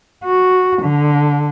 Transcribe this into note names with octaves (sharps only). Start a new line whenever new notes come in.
F#4
D3